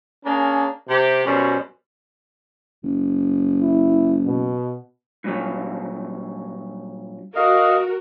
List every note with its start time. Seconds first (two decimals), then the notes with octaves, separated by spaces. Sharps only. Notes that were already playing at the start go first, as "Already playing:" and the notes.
0.24 A#3 C#4 D4 G#4 A#4
0.88 C3 G4
1.26 F#2 B2 G3 C#4 C5
2.83 F#1
3.61 E4
4.26 B2
5.24 G2 A#2 F#3
7.36 F#4 A#4 D#5 F5